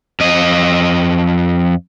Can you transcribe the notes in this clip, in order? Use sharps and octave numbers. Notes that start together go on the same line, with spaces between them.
F2 D#5